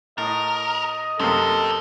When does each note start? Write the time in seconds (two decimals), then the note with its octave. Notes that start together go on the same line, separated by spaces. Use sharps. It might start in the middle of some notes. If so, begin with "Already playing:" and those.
0.18 A2 A#4 D#5
1.19 F#2 C3 A#3 G4 A4 C5